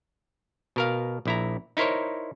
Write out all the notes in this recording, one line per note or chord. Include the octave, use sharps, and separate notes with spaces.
B2 A#4 F5
A#1 E4 A#5
D#4 E4 A#4 C5 C#5